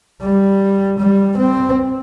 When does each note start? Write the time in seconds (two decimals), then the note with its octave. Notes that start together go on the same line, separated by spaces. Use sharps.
0.21 G3
0.99 G3
1.37 C4